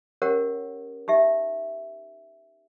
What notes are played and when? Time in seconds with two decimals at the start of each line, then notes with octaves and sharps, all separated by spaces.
0.22 C#4 G4 A#4 C#5 F#5
1.08 D#4 G4 E5